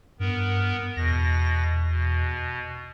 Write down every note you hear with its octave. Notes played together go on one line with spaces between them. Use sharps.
G2 B3 A#4
E2 B2 A#6
B2